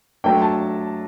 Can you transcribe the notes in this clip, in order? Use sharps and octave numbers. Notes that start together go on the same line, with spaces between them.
F#3 A3 D4 G5
A5